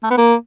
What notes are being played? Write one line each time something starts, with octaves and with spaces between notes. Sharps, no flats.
A3
B3
A#3